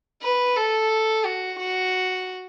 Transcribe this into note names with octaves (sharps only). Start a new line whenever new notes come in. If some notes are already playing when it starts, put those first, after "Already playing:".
B4
A4
F#4
F#4